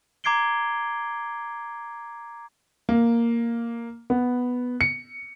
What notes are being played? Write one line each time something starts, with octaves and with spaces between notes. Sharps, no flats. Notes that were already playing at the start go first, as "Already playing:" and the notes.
A#5 D6 G#6 C7 D7 G7
A#3
B3
C#7